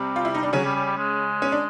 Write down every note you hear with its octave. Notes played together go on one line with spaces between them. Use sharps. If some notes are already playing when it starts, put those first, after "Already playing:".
Already playing: C3 G3 C4
F4
E4
D#4
G3 D4
C#3 F#3 C#4
G3
G3
G3
G#3
C#4
D4